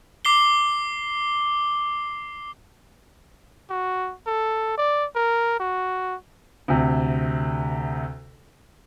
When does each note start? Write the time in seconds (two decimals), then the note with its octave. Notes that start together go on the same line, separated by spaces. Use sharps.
0.25 D6 C7 G7
3.70 F#4
4.26 A4
4.77 D5
5.15 A#4
5.59 F#4
6.68 D2 C3